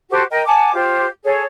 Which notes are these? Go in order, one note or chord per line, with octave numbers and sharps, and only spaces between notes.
F#4 G4 A4 C5
A#4 D#5 G5
F#5 G#5 A5 D6
F4 G4 C5
G#4 A4 C#5